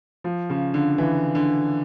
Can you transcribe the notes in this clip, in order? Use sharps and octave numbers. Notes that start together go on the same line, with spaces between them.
F3
C#3
D3
E3
D3